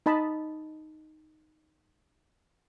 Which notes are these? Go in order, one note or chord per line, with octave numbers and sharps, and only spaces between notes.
D#4 D#5 A5 B5